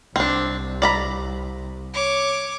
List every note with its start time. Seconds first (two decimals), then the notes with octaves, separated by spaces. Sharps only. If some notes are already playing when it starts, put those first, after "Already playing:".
0.16 C2 C4 D4
0.82 D5 A#5 B5
1.94 C#5 D6